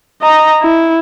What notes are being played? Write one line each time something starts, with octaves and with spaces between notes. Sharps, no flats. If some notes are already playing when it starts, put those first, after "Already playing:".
D#5 A#5
E4